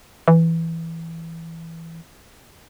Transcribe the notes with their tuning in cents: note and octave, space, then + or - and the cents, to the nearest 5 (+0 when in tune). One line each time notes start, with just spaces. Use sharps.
E3 +0